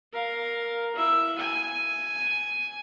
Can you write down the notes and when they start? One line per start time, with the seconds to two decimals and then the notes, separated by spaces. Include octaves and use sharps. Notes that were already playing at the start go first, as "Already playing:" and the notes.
0.12 A#4 F5
0.95 E4 E5
1.38 G#5